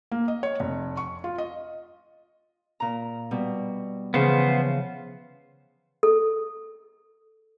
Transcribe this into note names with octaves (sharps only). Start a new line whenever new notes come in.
A#3
D#5
C#5
F1
C#6
F4
D#5
A#2 A#5
B2 G3
C#3 E3 F3 B3 C5
A4